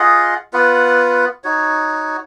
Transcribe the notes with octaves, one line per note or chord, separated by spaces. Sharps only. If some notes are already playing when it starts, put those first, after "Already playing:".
Already playing: F4 G#4 D#5 F#5
B3 F4 B4 F#5
D#4 F#4 C#5